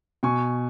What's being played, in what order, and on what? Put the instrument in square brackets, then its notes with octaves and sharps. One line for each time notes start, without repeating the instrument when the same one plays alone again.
[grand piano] B2 G#5 C#6